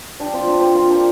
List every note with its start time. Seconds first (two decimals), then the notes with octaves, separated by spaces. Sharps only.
0.20 D4 G4
0.33 C4 F4
0.47 D4 G4
0.61 G4 C5
0.75 F4 A#4
0.89 D4 G4